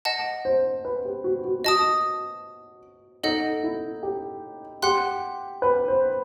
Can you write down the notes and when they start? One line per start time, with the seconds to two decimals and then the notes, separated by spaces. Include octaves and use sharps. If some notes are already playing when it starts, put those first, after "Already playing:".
0.05 D#5 F#5 A5
0.45 C5
0.85 B4
1.05 G4
1.24 F#4
1.45 F#4
1.64 F#4 D#5 A5 D#6
3.23 D#4 A4 D#5 F#5
3.63 E4
4.03 G4
4.82 G4 F#5 C6 F#6
5.62 B4
5.88 C5